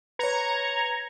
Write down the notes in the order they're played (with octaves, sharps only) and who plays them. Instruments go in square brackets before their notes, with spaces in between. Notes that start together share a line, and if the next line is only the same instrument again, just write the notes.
[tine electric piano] B4 C#5 [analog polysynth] A#5 G#6 C#7